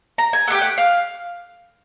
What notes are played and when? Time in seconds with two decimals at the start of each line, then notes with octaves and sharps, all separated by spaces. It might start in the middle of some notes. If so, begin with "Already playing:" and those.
0.18 A#5
0.33 G#5
0.47 A3 F#5
0.50 D4 G4 G5
0.62 F#5
0.78 F5